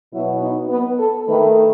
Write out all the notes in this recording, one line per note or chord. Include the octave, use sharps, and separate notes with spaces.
B2 F#3 B3 E4
D#4
B3
A4
D#3 A3 B4